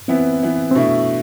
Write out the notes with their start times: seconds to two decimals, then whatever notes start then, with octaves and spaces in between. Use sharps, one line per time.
0.08 E3 B3 C4 E4
0.42 E3 B3 E4
0.71 C4
0.75 B2 A3 D4 E4